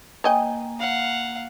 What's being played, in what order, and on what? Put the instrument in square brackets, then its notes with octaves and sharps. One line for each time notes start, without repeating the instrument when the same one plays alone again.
[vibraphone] A#3 [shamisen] C#5 D#5 G5 [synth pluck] G#5
[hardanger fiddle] F5 F#5